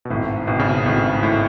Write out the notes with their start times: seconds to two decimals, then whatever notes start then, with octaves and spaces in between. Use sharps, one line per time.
0.05 B2
0.10 G#1 A2
0.47 G#1 B2
0.59 C#3
0.71 B2
0.86 G#1 A2
1.23 A2